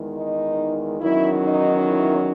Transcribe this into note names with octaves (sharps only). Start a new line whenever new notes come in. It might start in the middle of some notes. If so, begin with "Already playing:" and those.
Already playing: E2 D#3 G#3
D#4
E2 D#3 F#3 C#4 E4
D#4
E4